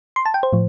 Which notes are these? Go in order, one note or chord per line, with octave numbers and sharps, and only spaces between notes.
C6
A5
G5
C5
A2 F3